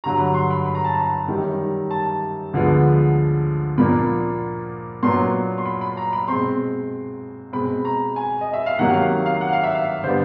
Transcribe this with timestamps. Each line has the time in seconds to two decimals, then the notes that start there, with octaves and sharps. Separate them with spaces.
0.04 G2 D3 F#3 A#5
0.19 B5
0.34 C6
0.51 B5
0.65 B5
0.75 A#5
0.85 A5
0.94 A#5
1.28 F#2 D#3 G3
1.91 A5
2.53 D2 D3 F3 G#3 B3
3.78 A#2 F3 A#3 D4 B5
5.03 A#2 F#3 B3 D4 C6
5.58 C6
5.65 B5
5.81 B5
5.97 A#5
6.13 B5
6.28 B2 G#3 C4 C6
7.53 B2 G#3 C4 B5
7.85 A#5
8.16 G#5
8.41 D#5
8.53 E5
8.66 F5
8.78 C3 D#3 F#3 A#3 F#5
8.93 F5
9.26 F5
9.41 F#5
9.53 F5
9.64 E5
9.75 F5
10.04 D3 G3 B3 D4 C5